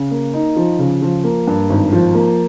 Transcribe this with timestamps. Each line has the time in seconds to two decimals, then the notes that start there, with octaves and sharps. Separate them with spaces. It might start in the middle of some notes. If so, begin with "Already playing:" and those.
Already playing: C#3
0.11 A#3
0.34 D#4
0.56 F3
0.79 C#3
1.02 F3
1.24 A#3
1.47 G2
1.70 G#1
1.92 F3
2.14 A#3